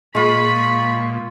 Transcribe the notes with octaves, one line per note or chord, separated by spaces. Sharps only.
A#2 G#3 F4 B5 C#6